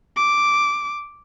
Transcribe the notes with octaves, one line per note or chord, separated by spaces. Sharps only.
D6